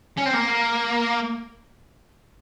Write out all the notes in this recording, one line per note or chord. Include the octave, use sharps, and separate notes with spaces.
C#4
C4
A#3